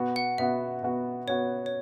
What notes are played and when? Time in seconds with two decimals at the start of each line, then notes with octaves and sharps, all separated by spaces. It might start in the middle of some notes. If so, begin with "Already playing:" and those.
Already playing: B2 B3 F#4
0.16 F#5
0.38 B2 B3 F#4 E5
0.83 B2 B3 F#4
1.28 B2 B3 F#4 C#5
1.66 C#5